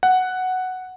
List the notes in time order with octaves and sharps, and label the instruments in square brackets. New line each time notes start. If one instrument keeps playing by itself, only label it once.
[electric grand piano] F#5